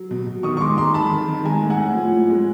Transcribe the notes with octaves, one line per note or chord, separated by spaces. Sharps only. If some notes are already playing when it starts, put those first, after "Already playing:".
Already playing: F#3
B2
B2
D#3 C#6 D#6
C#6
G#3 C6 D6
G#3 A#5 C6
D#3 A5 B5
D#3
D#3
G#3 G#5 A#5
A2
F#5 G#5
A2
F3
A2
G#3